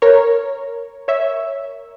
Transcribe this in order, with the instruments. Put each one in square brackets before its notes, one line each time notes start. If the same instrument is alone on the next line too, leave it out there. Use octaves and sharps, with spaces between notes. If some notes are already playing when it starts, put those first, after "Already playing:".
[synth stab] A#4 C#5
C#5 E5